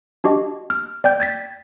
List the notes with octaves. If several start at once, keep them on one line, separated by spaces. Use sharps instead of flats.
D4 F#4 G4 D#5
F6
D5 G5 G6
G#6 A6 B6